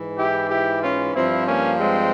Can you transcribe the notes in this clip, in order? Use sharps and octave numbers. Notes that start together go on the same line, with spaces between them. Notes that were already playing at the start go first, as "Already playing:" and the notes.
Already playing: G#2 E3
E4 G4
E4 G4
C#4 F4
G2 F3 C4 E4
A#3 C#4
G#3 C4